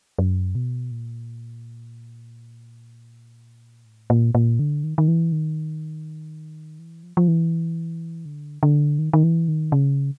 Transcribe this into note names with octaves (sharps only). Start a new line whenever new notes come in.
F#2
B2
A#2
A2
A#2
A#2
D3
D#3
D#3
E3
D#3
E3
F3
F3
E3
D3
D3
D#3
D#3
E3
D#3
C#3